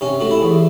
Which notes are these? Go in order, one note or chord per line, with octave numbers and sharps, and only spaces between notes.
C3 C#4
A3 F#4
E4
E2